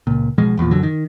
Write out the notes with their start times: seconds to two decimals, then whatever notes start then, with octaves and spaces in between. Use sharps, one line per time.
0.07 C#2 A#2
0.38 B1 B2 F3 G#3
0.57 E1 E2 A#2 F3
0.71 G1 F#2 D3 F#3
0.83 D#3